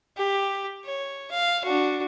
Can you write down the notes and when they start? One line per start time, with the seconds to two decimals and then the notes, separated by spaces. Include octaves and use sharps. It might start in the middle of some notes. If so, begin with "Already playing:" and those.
0.17 G4
0.85 C#5
1.31 F5
1.64 D4 F#4